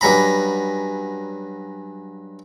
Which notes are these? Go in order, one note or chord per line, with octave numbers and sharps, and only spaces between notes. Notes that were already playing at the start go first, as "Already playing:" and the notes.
G2 F#3 C#4 A#5 B5